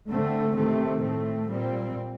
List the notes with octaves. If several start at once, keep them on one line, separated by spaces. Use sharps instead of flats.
D3 A3 C4
C3 D#3 A3 C4
A2 A3 C4
A#2 G3 C4